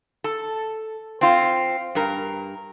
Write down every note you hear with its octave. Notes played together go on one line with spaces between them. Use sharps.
A4
C4 F4
G2 A#4